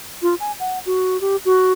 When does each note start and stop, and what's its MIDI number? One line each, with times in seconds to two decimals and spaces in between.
0.22 0.35 65
0.40 0.52 80
0.60 0.79 78
0.86 1.20 66
1.21 1.36 67
1.45 1.72 66